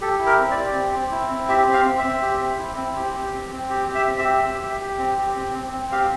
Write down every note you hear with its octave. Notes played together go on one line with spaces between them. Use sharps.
G4 A4
E4
A#4
C4
D5
G4
C4
C4
E4
C4
G4 E5
C4
F5
C4
E5
C4
G4
C4
E4
C4
G4
G4
C4
C4
G4
G4
E5
C4
E5
G4
G4
G4
G4
C4
G4
C4
C4
C4
G4 F5